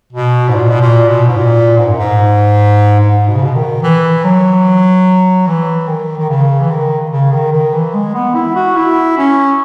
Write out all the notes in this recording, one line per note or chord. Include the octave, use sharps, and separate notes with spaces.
B2
G#2
A#2
B2
A#2
B2
G#2
A#2
G#2
F#2
G#2
G#2
B2
C#3
B2
D#3
E3
F#3
E3
D#3
D#3
C#3
E3
D#3
C#3
D#3
D#3
E3
G#3
B3
E4
F#4
E4
C#4